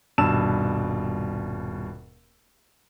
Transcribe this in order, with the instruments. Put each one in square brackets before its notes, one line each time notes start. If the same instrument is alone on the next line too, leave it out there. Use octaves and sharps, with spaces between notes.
[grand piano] D#1 G2 B2 A5 E6 E7